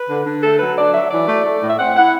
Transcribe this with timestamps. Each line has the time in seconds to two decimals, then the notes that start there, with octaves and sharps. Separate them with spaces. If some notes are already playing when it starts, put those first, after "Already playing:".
Already playing: B4
0.08 D3
0.25 D3
0.42 A3 A4
0.59 F#3 B4
0.76 D4 D5
0.93 F#3 E5
1.10 E3 D5
1.27 A3
1.44 A3
1.62 A2
1.69 E5
1.78 C4 F#5
1.95 E4 F#5